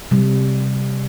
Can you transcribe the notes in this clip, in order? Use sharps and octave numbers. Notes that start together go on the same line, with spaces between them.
C3 G3